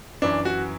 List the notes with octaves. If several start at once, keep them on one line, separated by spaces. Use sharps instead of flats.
F#2 E3 D4
F#4